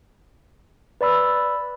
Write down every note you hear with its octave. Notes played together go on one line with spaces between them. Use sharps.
B4 D5 B5 E6